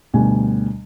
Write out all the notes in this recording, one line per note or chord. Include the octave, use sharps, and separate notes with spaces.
D2 B2 G3 G#5